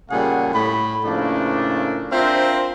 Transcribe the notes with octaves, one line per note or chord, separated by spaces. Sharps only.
A#2 C#3 G3 A3 G#4 F#5
A2 B5
A2 C#3 F3 A3 A#3 D4
C4 D4 F4 A#4 C5 E5